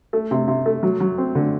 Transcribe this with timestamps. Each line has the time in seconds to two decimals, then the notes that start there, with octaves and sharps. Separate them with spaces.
0.13 A3
0.31 C3
0.48 C3
0.66 A3
0.83 F#3
1.00 F#3
1.18 C4
1.35 D3